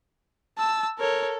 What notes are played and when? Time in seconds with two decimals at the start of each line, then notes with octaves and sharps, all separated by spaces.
0.58 A5 E6
0.99 A4 A#4 C#5